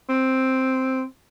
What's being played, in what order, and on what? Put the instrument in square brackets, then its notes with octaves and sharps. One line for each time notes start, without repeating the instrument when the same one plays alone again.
[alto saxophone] C4